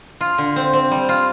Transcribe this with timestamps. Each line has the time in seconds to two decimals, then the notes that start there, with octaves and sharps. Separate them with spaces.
0.21 F4
0.38 D3
0.56 C4
0.73 C4
0.91 G3
1.09 F4